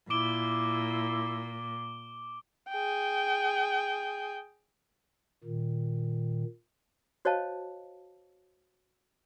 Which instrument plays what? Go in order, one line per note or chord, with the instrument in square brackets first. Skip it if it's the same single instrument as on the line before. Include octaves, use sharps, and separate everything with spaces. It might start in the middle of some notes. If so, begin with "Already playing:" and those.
[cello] A#2 [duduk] E4 [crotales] D6 D7 G7
[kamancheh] G#4 G5
[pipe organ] A#2 D#3
[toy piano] F#4 C5 C#5 D#5 F5 A5